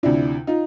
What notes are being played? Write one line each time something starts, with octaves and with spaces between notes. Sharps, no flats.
D2 C3 F3 D4 E4
D#4 F4